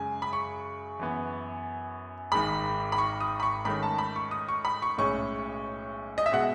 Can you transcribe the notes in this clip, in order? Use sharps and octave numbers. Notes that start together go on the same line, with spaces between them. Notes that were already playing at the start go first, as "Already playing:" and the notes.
Already playing: F#2 C#3 G#3 G#5
B5
C#6
F#2 E3 B3
G#1 G#2 D#3 G#3 B5
B5
C#6
D#6
B5
C#6
G#2 D#3 A3 C#4 B5
A5
B5
C#6
D#6
C#6
B5
C#6
B1 A2 G#3 C#4 C#6
D#5
E5
B2 G#3 F#5